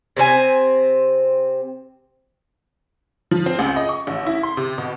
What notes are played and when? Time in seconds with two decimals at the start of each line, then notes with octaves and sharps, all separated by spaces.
0.16 C3 C4 D#4 G#5
3.31 F3
3.46 C4
3.59 C#2
3.76 D#5
3.89 C#6
4.07 A1
4.27 E4
4.43 C6
4.57 C3
4.78 B2